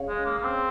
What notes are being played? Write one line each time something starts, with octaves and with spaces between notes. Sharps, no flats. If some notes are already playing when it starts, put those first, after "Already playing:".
Already playing: C#4 G#4 C#5 F5
G#3
A#3
A#3
C4